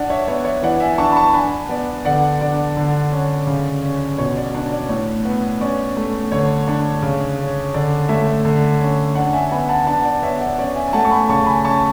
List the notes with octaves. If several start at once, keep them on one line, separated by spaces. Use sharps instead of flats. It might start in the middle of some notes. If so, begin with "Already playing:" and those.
Already playing: D4 D5 F#5
C#5 E5
B3 C#5
C#5 E5
E3 D5 F#5
E5 G#5
D4 A5 C#6
B5
A5 C#6
D4 G#5 B5
B3 D5
D3 D5 F#5
D4 D5
D3
C#4
C#3
C#4
B2 C#5
D5
D4 D5
D5
A2 C#5
B3
C#4 D5
A3
D3 C#5
D4
C#3
C#4
D3 D5
A3 C#5 E5
D3
C#4
D4 D5 F#5
E5 G#5
B3 G#5 B5
F#5 A5
D4 F#5 A5
D5 F#5
B3 C#5 E5
D5 F#5
C#4 D5
E5 G#5
G#5
A3 F#5 A5
C#6
G#5 B5
C#3 A5 C#6
G#5 B5
C#4 A5 C#6